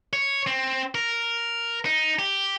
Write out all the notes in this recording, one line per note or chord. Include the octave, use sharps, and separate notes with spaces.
C#5
C4
A#4
D#4
G4